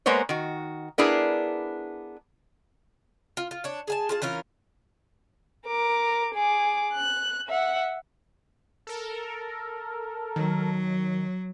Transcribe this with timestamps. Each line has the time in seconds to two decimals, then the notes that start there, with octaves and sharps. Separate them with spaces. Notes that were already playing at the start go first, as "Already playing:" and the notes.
0.06 G#3 A#3 B3 C5 C#5
0.29 D#3 F#4
0.98 B3 D4 E4 G#4 A#4
3.37 F4
3.51 F4
3.64 D4 C#5
3.88 G#4 G#5 A5
4.09 F4 G#4 A5
4.22 E3 C#4 F4 A#4
5.67 A#4 D6
6.34 G#4 D6
6.94 F#6
7.48 E5 F#5
8.87 A4 A#4
10.36 D#3 F#3